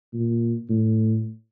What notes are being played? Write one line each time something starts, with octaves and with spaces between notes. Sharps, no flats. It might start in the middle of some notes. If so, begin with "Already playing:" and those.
A#2
A2